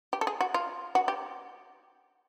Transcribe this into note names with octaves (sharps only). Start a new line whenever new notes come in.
G4
A4
G#4
F#4
F4
F#4
G4